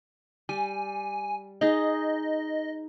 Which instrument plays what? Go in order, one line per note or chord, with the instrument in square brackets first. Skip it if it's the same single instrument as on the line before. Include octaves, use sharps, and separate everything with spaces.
[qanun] G3 [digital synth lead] G#5
[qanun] D#4 G#4 [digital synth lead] D#5